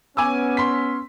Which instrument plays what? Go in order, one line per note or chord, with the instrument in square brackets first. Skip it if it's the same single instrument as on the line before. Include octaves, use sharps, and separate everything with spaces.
[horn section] B3 C#4 [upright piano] G#5 D6 E6
[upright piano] C6 B6